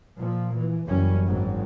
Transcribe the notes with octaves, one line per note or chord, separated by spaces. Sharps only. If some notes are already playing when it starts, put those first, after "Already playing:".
A#2 F3
E3
F#1 F#2 E3 G3 C#4
G#1 G#2 F#3